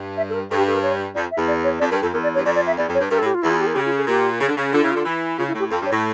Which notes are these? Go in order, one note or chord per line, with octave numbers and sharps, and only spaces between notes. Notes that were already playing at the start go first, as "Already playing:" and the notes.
Already playing: G2
E5
A4
A#4
G2 A4
G4
A4
A#4
C#5
F2 D5
E5
E2
D5
C#5
F2 D5
G2 A#4
F2 A4
E2 A#4
D5
G2 C#5
F2 D5
D5
E5
E2 D5
F2
C#5
G2
G2 A#4
A4
A2
G4
F4
E2 E4
F4
G4
A#4
C#3 G4
F4
A4
A#2 G4
C#3
D3
C#3
D3 F4
C#3 E4
D3 F4
E3
C#3 F4
E4
A2
G4
F2 A4
G2 C#5
A2